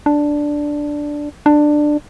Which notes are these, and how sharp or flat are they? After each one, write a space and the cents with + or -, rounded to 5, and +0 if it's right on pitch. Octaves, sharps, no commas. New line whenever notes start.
D4 +0
D4 +15